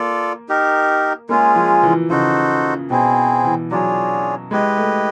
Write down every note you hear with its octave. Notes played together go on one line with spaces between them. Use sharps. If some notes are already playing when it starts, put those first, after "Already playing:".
Already playing: A#3 F4 A4 D5
D#4 G4 A#4
G#3 A#3 C#4 F4 G#4
F3
E3
C#3 D#4 F#4 A4 C5
B2 C4 E4 G#4 C5
E3
F#3 D4 F4 G#4 C#5
G#3 E4 G4 B4 D#5
A3